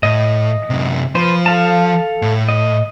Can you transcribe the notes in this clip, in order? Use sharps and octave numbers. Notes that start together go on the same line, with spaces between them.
A2 D#5
F#2 C3
F3 B4 C5
A4 F5 A5
A2
D#5